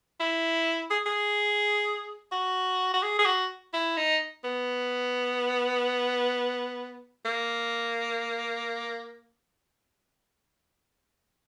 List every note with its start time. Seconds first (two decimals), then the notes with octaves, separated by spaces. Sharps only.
0.20 E4
0.91 G#4
1.06 G#4
2.32 F#4
2.94 F#4
3.03 G#4
3.19 G#4
3.26 F#4
3.74 E4
3.97 D#4
4.44 B3
7.26 A#3